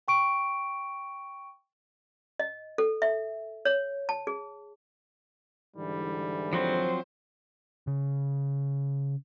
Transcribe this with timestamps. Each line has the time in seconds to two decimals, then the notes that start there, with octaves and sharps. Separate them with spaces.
0.08 G5 C#6 D7
2.39 D#5
2.78 A4
3.02 E5
3.65 C#5
4.09 A5
4.27 G#4
5.76 G#2 D3 E3 G3
6.53 F3 F#3 C4 C5
7.87 C#3